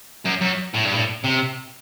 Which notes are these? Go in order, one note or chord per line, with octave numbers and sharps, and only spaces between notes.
F#2
F#2
A2
G2
A2
C3